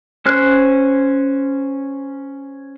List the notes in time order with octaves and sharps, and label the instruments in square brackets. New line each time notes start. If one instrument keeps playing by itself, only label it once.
[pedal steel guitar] C#4 C5 F#6